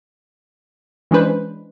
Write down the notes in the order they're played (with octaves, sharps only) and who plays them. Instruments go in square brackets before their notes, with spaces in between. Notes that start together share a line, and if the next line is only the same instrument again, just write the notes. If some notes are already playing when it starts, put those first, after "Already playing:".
[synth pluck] E3 G#3 C#4 D4 B4 C5